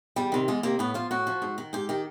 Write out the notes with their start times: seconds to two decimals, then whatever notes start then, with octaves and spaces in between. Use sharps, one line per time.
0.16 E2 G3
0.32 C3 D#3
0.48 E2 G#3
0.63 C3 D#3 A#3
0.79 A2 B3
0.94 F3 F4
1.11 A2 F#4
1.27 F3
1.42 G#2
1.58 D#3
1.73 G#2 G4
1.89 D#3 G4